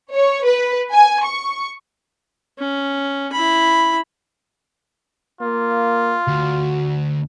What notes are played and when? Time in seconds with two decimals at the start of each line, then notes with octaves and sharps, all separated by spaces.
0.14 C#5
0.45 B4
0.92 G#5
1.25 C#6
2.59 C#4
3.32 E4 B5
5.41 A#3 F4
6.27 D2 F#4